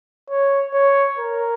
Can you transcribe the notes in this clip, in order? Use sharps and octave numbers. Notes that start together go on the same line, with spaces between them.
C#5
C#5
A#4